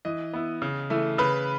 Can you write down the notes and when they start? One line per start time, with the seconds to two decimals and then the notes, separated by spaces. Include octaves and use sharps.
0.05 E3 D#5
0.33 B3 E4
0.62 C#3
0.90 E3 A3 E4
1.18 C#3 B4